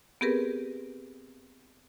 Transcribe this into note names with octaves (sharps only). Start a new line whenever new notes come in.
B3 C4 G4 G#4 A#4 B4